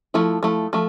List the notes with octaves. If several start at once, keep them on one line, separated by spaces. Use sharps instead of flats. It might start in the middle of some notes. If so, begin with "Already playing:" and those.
F3 A3 E4
F3 A3 E4
F3 A3